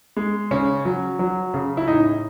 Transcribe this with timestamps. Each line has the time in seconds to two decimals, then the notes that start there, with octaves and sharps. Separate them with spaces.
0.17 G#3
0.51 C#3 C#4
0.85 F#3
1.19 F#3
1.54 C#3
1.77 E4
1.88 A2 D#4